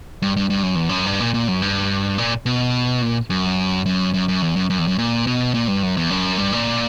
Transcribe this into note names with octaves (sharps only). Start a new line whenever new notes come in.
G2
G2
G2
F#2
E2
F#2
G2
A#2
A#2
F#2
G2
A#2
B2
A#2
F#2
F#2
F#2
F#2
E2
F#2
F#2
E2
F#2
A#2
B2
A#2
G2
F#2
E2
F#2
G2
A#2